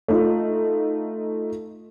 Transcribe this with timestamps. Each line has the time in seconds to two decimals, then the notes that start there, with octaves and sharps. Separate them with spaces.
0.08 A3 D#4 F4